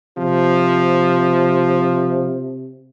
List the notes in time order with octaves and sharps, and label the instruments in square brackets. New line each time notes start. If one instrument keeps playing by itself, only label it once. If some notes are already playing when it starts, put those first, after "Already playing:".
[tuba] C3 [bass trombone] F3